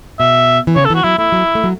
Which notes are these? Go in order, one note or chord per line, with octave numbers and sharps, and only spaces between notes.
B2 E5
E3
C#3 C#5
A4
E3
F#4
F#3 E4
A3 E4
F#3
A3
F#3